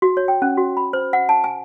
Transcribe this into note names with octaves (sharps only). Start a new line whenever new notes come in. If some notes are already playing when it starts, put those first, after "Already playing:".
F#4
C#5
G5
C#4
F#4
B5
C5
F#5
A5
G#5